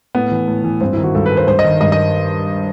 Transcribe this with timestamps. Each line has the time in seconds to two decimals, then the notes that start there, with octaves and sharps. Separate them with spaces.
0.15 A2 B3
0.31 E3
0.48 A2
0.64 E3
0.81 G2 C4
0.93 D#3 E4
1.03 F#4
1.15 G2 A4
1.26 B4
1.32 D#3
1.37 C5
1.47 G2 C5
1.59 D#5
1.64 D#3
1.81 G2 D#5
1.92 D#5